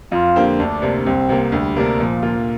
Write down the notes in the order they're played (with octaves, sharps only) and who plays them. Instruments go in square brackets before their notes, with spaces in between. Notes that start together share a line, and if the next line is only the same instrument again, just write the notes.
[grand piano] F2 [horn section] F4
[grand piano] D3 A#3 G4 C5
[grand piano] D2 [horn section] D4
[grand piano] C3 A#3
[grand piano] C2 [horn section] C4
[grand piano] C3 A#3
[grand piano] D2 [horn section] G3
[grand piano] C3 A#3 D4 A#4
[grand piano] A#2 [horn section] F3
[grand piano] A#3 F4